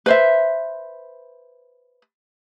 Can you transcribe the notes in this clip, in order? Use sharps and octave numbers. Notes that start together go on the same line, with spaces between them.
B4 C5 E5